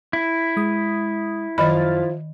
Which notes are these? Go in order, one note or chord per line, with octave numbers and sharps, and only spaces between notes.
E4
G#3 D#6
F#2 D#3 F3 D#5 B5 F6 A6